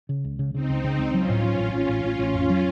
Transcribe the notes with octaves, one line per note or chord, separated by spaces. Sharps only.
C#3
C#2
C#3
C#3 C4 D#4
C#2
C#3
C#2
F#3 C#4 F4
A2
F#3
A1
A1 C#4 F4
A1
A1
A1
F2
F#3